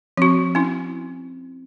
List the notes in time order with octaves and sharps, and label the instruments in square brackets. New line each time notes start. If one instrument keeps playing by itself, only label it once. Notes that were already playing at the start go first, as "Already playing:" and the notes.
[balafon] F3 F#4 [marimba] C4
[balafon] C#4 E4